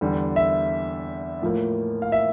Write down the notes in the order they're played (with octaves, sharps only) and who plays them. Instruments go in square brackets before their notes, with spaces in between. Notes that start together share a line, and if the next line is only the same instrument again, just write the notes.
[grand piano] E2 D3 G3
E5
A2 F3 A#3
F5
E5